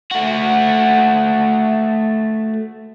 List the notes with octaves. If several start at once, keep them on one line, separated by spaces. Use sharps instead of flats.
A3 F#4